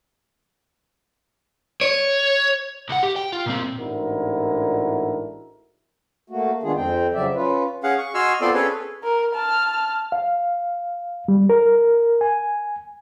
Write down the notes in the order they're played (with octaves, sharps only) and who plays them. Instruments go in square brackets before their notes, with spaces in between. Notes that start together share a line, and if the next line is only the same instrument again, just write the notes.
[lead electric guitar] C#5
[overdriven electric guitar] C2 F#5
G4
G5
F4
A#2 C4
[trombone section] A1 G#2 D4 E4 F#4 A#4
[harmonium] A3 A#3 F#4
D#3 G#3 B3 D4 F4 G#4
F2 C4 G5
C#3 F3 F#3 D5 E5
C#4 F4 B4
[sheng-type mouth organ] C#4 G#4 F5 F#5
C#6
F#4 D#5 G#5 C6 E6 F6
B3 C4 F4 A4 D5 C6
C#4 G#4 A4 B4 C#5
[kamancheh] A#4
A5 F6
[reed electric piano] F5
G3
A#4
G#5